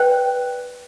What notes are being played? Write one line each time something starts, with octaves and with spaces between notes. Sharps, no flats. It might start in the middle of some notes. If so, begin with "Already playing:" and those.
Already playing: B4 D5 G5 F#6